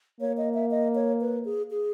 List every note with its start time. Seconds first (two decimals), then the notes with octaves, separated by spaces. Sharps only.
0.21 A#3 C#5
0.38 D#5
0.54 E5
0.71 D#5
0.95 C#5
1.21 B4
1.45 G#4
1.71 G#4